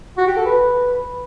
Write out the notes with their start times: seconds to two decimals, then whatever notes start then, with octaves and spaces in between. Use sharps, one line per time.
0.18 F#4
0.27 G4
0.36 A4
0.46 B4